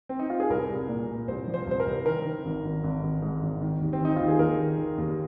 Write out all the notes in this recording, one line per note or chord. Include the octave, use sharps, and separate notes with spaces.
C4
D#4
F4
G#4
C2 A#4
C2
A#2
A#2
C2 C5
F3
C5
C2 C5
A#4
C2
D#3 A#4
D#3
G#1
G#1
G#1
G#1
G#2
G#1
D#3
D#2
C4
D#3 D#4
D#2 F4
G#4
D#2 A#4
D#3
D#3
D#2